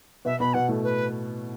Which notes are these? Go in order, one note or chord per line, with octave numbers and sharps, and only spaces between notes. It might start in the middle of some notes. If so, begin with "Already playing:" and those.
B2 B3 E5
B2 B3 B5
B2 B3 F#5
A2 A3
B4